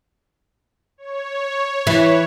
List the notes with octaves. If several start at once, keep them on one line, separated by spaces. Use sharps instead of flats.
C#5
E3